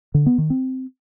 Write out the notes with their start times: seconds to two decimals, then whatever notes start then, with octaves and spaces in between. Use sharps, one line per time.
0.14 D3
0.26 B3
0.38 D#3
0.50 C4